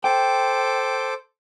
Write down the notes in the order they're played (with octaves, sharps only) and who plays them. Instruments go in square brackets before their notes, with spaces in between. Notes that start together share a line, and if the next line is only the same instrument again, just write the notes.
[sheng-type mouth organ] A4 C5 D6 [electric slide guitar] G5